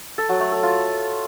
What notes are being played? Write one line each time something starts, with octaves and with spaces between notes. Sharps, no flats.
A4
F#3
A3
A4
F4